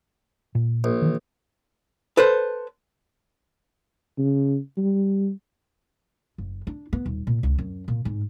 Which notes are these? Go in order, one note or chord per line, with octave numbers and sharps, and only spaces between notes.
A#2
A#1
D#3 E3
A4 B4 C5
C#3
G3
F#1
D4
B3
D#1
A#2
C#2
F#2
A#2
G#2